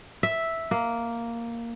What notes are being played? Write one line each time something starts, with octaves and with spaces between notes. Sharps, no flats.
E5
A#3